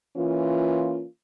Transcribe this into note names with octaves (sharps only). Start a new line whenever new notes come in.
E3 A#3 C#4 F4